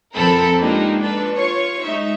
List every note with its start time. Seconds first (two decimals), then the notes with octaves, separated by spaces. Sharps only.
0.15 F2 C4 A4 A#4 B5
0.60 G#3 A#3 D4 D#4 F4 G4
0.99 D4 F4 A4 B4
1.34 F4 C#5 C#6
1.84 G#3 D#4 E5